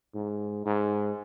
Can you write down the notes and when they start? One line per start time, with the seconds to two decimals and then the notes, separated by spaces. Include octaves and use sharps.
0.15 G#2
0.66 G#2